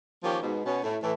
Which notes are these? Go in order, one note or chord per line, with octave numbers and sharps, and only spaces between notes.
D#3 F3 A#3 C#4 G4
G#2 B2
B2 C#4
A2
A2 E3